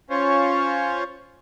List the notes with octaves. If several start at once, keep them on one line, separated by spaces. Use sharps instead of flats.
C#4 F4 C5 C#5